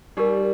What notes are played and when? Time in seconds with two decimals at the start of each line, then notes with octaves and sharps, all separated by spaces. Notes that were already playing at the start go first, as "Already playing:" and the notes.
0.17 G3 D#4 G4 A#4